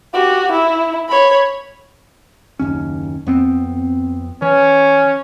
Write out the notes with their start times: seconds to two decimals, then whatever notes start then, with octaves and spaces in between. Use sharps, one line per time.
0.13 F#4 G4
0.51 E4
1.09 C#5 B5
2.59 F#1 D#2 C#4
3.27 F2 B3 C4
4.42 E3 C#4